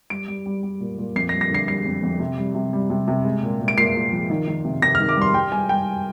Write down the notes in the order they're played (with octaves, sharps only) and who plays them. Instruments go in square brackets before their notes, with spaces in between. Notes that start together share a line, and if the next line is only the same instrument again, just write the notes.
[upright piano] G3 D7
G3
G3
G3
A#2
A#2
F2 C7
A#6
G3
A#6
D3 C7
G3 C7
F2
F2
C3
G3
C3
G3
C3
C3
G#3
A#2
A#2
D7
A#2 C7
A#2
F3
D#3
D#3
C3
C3 A#6
D#3 F6
D6
G3 C6
G3 G5
G3 G#5
G3 G5